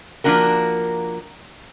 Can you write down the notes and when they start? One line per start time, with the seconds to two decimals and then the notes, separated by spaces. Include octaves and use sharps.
0.24 F3 A#3 D4 F#4 A#4